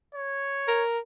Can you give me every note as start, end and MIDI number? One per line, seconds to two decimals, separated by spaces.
0.15 0.83 73
0.68 0.99 70